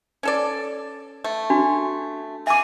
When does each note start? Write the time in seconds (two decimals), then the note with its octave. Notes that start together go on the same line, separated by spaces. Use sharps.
0.23 C#4 A4 D5
1.24 A3
1.50 D4 F#4
2.47 E5 G#5 D6